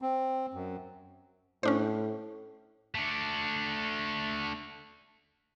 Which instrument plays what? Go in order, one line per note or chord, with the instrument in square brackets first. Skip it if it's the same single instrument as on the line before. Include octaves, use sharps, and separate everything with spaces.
[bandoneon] C4
F#2
[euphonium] A2 [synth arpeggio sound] C#4 D4 C5
[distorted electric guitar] A3 D4